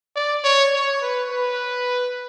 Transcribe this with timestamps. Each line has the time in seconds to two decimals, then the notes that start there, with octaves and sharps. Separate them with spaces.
0.16 D5
0.44 C#5
0.73 C#5
1.02 B4
1.31 B4